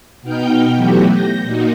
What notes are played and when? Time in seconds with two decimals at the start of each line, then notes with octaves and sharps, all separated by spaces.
0.22 B2 B3 D#4 G5 F6 G6
0.75 E3 F#3 A3 B3 F#4 G4
1.10 G6 A#6
1.42 A#2 A#3 D#4 F#4